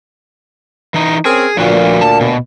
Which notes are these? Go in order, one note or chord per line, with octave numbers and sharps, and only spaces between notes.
E3 D#4
C4 C#4 G#4 A#4
D2 A#2 F3 F#4 B4
A5
B2